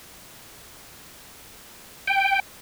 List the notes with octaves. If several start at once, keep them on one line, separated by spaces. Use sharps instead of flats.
G5